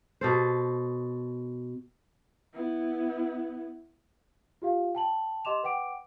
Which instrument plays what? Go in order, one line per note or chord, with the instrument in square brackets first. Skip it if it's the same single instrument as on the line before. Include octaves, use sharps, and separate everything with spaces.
[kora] B2 A4 C5
[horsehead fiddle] B3 E4
[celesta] F4 G4 F5
G5 A5 F#7
G4 D#5 C6 D6 E7 F7
B4 F#5 G5 D6 D7